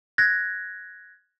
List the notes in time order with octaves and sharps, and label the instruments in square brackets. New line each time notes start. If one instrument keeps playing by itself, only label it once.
[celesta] F#6 G#6 A#6